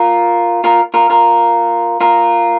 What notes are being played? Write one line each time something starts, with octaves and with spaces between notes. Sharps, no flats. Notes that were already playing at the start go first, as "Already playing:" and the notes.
Already playing: F4 A#4
F4 A#4
F4 A#4
F4 A#4
F4 A#4